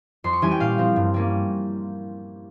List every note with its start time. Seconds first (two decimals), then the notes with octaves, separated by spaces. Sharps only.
0.24 F2 C6
0.33 C#6
0.42 E3 G3 C#4 G#5
0.51 G5
0.60 A#2 F5
0.78 F3 C4
0.96 G2
1.14 G3 A#3 C#4